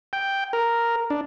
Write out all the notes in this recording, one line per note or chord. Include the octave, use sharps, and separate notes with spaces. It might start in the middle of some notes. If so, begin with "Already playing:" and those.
G5
A#4
D4